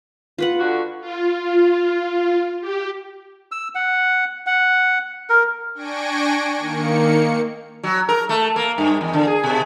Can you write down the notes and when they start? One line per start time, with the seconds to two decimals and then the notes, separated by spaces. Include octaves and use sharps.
0.38 F4 B4 F#5
0.60 D3 F#4
1.01 F4
2.61 G4
3.52 E6
3.75 F#5
4.46 F#5
5.30 A#4
5.75 D4 G5 G#5 C#6 A#6 D7
6.59 D#3 A#3 C#7
7.83 F#3
8.09 A#4
8.29 A3
8.56 A#3
8.78 G2
9.01 E2
9.13 D3
9.27 G#4
9.44 B2